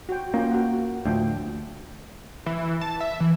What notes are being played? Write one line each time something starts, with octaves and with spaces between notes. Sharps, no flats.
F#4 G5
A#3 C#4 F4 G5
F#4 F#5
D2 A2 F3 G5
E3
A5
E5
E3